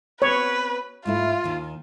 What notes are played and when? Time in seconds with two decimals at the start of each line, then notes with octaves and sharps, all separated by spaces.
0.22 B3 C4 B4 C#5
1.06 G#2 A3 E4 F4
1.44 D#2 D#3